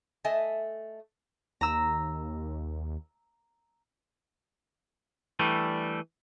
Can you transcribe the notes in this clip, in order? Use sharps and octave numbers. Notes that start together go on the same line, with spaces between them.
A3 D#5 E5 G#5 A5
D#2 A#5 E6
E3 G3 A3 D4